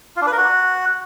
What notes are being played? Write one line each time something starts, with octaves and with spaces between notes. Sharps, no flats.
F4
D4
B4
A#4
F#4